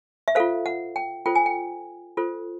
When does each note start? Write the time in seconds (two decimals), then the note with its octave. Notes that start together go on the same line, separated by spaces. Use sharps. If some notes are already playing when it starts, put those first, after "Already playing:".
0.28 E5
0.35 F4 A4 C5 F5
0.66 F#5
0.96 G5
1.26 F4 A4 C5 G5
1.35 G#5
1.46 G5
2.17 F4 A4 C5